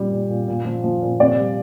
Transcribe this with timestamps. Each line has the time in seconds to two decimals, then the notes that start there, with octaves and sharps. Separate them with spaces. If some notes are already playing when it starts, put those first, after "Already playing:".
Already playing: A#2 G3
0.11 A#2
0.30 A#2
0.48 A#2
0.65 F3
0.84 F3
1.02 A#2
1.20 C3 D5
1.38 G3